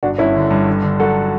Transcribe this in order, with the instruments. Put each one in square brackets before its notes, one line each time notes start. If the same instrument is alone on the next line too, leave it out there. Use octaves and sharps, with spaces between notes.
[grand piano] G1 [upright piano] D4 F#4
[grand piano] G1 [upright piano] C#4 E4
[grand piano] D3
G2
D3
D3
[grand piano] F#3 [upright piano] F#4 A4